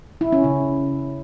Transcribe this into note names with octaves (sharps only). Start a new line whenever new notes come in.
E4
C#4
C#3